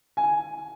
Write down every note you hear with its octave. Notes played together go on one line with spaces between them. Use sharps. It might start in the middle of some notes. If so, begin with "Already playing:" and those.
G#5